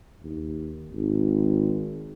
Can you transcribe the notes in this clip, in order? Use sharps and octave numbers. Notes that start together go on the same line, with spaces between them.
D#2
G#1